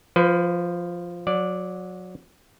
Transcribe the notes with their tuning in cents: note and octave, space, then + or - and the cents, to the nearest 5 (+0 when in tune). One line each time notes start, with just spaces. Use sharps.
F3 +0 B4 +35
F#3 -25 D5 +0